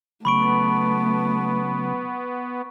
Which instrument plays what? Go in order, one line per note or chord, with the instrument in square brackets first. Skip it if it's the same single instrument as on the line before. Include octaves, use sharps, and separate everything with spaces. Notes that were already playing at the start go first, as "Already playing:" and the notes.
[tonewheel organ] C#3 F#3 [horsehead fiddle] A3 [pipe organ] B3 [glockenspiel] B5 C#6 D7